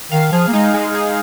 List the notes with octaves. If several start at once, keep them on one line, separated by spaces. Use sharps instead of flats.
D#3 F5
F3 G#4
A#3
G#3 D#4
G#3
G#4